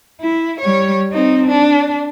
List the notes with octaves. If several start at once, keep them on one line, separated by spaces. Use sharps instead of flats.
E4
G3 C#5
C4 D#4
D4